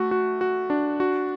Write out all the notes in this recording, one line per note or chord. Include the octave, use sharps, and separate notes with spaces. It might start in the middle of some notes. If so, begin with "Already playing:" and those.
Already playing: A3 F#4
F#4
F#4
D4
F#4